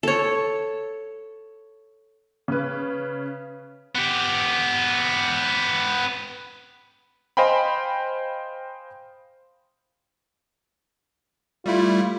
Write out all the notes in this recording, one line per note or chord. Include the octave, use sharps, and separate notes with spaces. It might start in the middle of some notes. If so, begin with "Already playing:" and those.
A4 C#5
C#3 B4
B3 G4
C5 D#5 F5 G5 G#5 B5
G3 A3 E4 F4